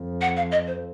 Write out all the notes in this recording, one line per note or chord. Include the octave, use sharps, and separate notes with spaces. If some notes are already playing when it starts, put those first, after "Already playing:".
Already playing: F2
F#5
F5
D#5
C5